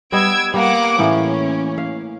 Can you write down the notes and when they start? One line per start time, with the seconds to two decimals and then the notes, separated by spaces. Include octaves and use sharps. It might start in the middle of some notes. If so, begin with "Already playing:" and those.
0.12 G3 B3 D#5 E6 G#6 D7
0.54 G3 A#3 F#5 D6
0.99 A2 E3 A#3 C#4
1.78 F5